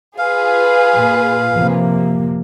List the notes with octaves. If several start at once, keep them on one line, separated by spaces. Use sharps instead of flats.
F4 G#4 B4 F5
A#2
C3 F3 A#3